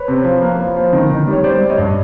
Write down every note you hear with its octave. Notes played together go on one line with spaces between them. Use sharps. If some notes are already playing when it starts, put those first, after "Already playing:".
Already playing: B4 C#5
C3
F3
A#3
F3
F3
D#3
D#3
G3
C#5
G3 C5 D5
G3
C#5 D#5
G2